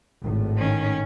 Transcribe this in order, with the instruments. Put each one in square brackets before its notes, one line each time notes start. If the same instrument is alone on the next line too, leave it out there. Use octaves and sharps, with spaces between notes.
[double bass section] G#1 A2
[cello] D#3 C#4